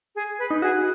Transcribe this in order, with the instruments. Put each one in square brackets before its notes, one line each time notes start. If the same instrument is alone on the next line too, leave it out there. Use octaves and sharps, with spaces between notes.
[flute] G#4
B4
[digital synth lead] D#4
[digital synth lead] F#4 [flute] G#4